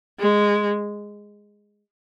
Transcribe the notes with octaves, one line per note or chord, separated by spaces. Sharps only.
G#3